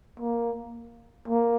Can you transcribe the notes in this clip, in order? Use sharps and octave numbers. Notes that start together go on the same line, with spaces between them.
A#3
A#3